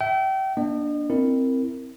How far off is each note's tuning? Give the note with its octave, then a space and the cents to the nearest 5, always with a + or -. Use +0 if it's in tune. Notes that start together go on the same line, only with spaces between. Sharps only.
E5 +0 G5 -35
A#3 +40 D4 +0 D#5 -40
C4 +0 E4 +0 A#4 -15